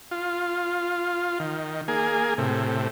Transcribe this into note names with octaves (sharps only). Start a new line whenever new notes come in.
F4
D#3
A#3 G#4
A2 C3